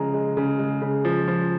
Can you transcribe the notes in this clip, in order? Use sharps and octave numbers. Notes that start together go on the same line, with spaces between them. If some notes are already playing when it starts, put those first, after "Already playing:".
Already playing: C#3 F3 G#3 A#5
G#3
C#3
G#3
C#3
F3
F3